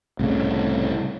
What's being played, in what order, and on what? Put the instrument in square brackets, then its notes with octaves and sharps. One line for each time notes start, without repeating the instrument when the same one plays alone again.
[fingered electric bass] C2 A2 C#3